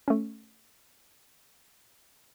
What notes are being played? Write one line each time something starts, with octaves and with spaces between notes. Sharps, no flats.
A3 C#4